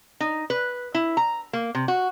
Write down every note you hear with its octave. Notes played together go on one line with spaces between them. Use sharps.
D#4
B4
E4
A#5
A#3
C3
F#4